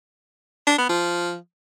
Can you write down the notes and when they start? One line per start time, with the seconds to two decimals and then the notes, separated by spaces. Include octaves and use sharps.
0.67 D4
0.78 B3
0.89 F3